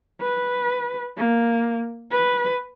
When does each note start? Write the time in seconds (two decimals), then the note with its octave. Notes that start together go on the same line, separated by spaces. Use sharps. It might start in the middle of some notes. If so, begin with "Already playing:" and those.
0.21 B4
1.17 A#3
2.11 B4